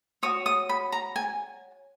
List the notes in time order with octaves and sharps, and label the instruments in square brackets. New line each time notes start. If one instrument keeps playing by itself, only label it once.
[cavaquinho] F#4 C#5 D#6
D#6
B5
A#5
G#5